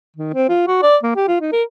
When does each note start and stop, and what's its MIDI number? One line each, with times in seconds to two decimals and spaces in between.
0.17 0.32 51
0.34 0.45 60
0.49 0.63 65
0.67 0.82 66
0.83 0.97 74
1.03 1.14 58
1.16 1.25 67
1.28 1.36 65
1.41 1.52 63
1.52 1.63 70